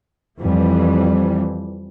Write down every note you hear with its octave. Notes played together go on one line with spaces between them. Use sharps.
F2 E3 G3